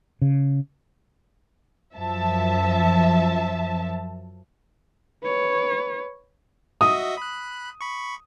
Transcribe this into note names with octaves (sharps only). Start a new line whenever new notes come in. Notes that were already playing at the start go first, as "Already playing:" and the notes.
C#3
F#2 F3 E5 A5
B4 C#5
F#4 D#5 E5 D#6
B5 F#6
B5 C#6